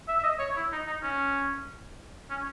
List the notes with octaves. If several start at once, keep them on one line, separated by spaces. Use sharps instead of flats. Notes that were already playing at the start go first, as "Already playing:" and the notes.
E5
E5
D#5
C#5
E4
D#4
D#4
C#4
C#4